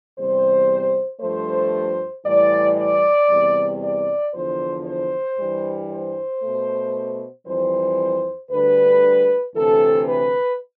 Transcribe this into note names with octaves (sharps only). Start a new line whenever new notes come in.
E2 C3 G3 C5
G2 F3 A3 C5
A2 E3 G3 D5
D5
E2 C3 G3
D5
E2 D3 F3 C5
C5
G2 E3 G3
C5
B2 A3
F2 E3 G3 C5
D2 D3 G3 B4
D2 C3 E3 A4
B4